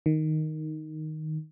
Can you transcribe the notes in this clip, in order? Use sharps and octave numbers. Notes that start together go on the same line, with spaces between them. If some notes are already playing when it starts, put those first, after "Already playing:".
D#3